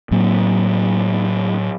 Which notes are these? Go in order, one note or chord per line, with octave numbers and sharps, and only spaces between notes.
A2 F#3 A#3 C4